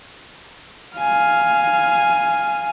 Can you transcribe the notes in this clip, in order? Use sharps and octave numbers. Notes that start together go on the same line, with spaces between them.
F5 G#5